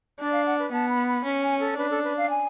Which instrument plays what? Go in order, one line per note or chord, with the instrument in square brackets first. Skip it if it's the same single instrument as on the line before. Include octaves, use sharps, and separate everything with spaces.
[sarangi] D4 [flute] D5
[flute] F5
F#5
B4
[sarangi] B3 [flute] A5
[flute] B5
B5
[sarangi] C#4
[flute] G#5
A4
[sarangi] D4 [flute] B4
[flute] A4
B4
F5
G#5